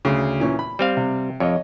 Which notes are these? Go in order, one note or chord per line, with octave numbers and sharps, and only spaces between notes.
D2 C#3
A#2 E3 C#4
B5
G3 C4 F5
C3
F2 C#5 D#5